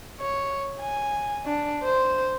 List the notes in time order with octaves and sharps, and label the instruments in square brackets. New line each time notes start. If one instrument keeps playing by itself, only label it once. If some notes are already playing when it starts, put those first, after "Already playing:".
[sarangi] C#5
G#5
D4
C5